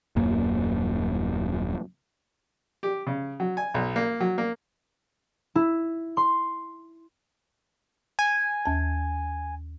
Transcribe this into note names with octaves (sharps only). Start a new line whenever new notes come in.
D#1 F#2 A#3
G4
C#3
F#3
G#5
B1
A#3
F#3
A#3
E4
C6
G#5
D#2 A5